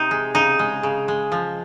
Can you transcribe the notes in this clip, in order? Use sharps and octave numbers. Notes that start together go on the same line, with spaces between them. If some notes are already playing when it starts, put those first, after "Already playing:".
Already playing: C3 D#4
G#3
C#3 D#4
G#3
C#3
G#3
F3